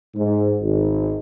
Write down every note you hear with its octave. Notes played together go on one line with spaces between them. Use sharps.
G#2
G#1